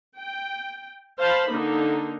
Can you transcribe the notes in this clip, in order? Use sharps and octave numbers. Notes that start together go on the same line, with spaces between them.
G5
C5 F5 A5 B5
D3 A#3 D#4